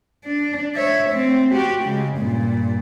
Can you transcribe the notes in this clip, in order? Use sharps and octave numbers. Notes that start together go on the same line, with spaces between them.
D4
C#5 E5
A3 C4
F#4 G4
C#3 G#3
G2 A#2